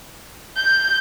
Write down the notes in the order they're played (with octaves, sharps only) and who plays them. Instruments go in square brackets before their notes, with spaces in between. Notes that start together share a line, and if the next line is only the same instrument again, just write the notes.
[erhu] G6